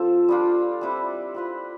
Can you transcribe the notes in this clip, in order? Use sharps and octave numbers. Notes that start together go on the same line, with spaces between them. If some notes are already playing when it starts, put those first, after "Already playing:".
Already playing: F3 C4 F4 A4
G3 D4 F4
G3 C4 E4 B4
C4 F4 B4